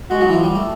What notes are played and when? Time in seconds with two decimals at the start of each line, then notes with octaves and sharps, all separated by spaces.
0.10 G#3 F#4
0.21 F#3
0.28 E3
0.33 F3
0.44 G3
0.55 A3